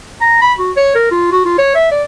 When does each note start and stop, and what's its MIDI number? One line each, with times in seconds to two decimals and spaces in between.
0.21 0.41 82
0.42 0.53 83
0.59 0.72 66
0.77 0.93 73
0.95 1.09 70
1.11 1.31 65
1.32 1.42 66
1.45 1.57 65
1.58 1.70 73
1.75 1.90 76
1.91 2.03 74